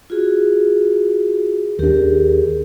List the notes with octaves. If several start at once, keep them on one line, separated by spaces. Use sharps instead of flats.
F4 F#4 G#4
D#2 D4 G4 G#4 A#4